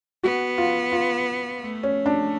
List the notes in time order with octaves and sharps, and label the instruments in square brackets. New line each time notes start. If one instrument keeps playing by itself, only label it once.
[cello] B3 [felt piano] F#4
[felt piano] F4
F4
[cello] A3
[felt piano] C#4
D4